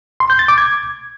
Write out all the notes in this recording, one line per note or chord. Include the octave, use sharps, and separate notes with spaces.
C6
G6
A6
D6
G#6